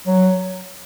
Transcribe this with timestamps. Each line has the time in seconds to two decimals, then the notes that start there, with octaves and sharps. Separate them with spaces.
0.06 F#3